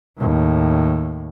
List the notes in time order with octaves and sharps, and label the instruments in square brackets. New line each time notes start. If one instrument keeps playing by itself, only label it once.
[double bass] D#2 A2